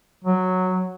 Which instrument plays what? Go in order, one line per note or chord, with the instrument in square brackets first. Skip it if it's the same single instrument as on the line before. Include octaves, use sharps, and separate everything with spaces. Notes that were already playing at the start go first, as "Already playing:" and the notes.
[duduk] F#3